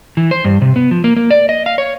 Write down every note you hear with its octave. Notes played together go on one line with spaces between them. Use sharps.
E3
C5
G2
C3
B3
F3
A#3
A#3
D5
D#5
F5
C#5